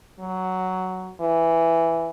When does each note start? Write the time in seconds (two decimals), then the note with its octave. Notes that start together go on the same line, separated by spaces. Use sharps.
0.20 F#3
1.21 E3